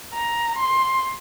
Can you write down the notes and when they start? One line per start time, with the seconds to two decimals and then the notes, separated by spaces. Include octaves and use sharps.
0.14 A#5
0.58 C6